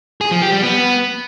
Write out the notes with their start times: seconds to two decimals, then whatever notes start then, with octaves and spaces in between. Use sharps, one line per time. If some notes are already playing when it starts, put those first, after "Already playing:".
0.21 G#4
0.31 F3
0.42 G4
0.52 G3
0.63 B3